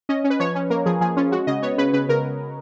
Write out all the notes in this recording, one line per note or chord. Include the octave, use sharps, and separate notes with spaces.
C#4 D#5
C#4
B4
F3 C#5
C#4
A#3 A#4
F3 G#4
F3 G#4
C#4 F4
G#3 F#4
C#3 D#5
B3 C#5
C#3 B4
C#3 B4
C#3 A#4